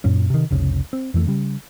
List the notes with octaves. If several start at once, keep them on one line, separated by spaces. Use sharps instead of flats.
F#2 A#2 C#4
C3 D#3
F1 C2 C#3
C4
F2 E3 A3
C#3 G3